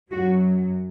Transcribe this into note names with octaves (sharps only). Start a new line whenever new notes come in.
F#2 F#3 F#4